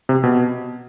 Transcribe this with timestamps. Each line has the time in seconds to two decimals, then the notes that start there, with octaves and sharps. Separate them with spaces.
0.09 C3
0.24 B2